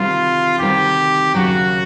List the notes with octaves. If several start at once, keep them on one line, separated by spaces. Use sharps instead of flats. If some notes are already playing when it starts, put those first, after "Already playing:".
Already playing: D2 C3 D#3 G3 C4 F4
D2 C3 D#3 G3 C4 G4
D#2 C#3 F#3 F#4